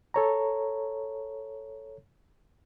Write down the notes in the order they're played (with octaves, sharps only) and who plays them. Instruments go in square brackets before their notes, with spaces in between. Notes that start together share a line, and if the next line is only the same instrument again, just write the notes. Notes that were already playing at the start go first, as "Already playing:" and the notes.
[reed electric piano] A4 C#5 A#5